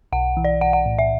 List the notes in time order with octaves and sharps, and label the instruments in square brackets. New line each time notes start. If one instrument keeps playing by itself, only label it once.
[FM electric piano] B1 [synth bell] F#5
[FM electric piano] E3
[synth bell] D5
[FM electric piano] B1 [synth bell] F#5
[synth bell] F#5
[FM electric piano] A2
[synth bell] E5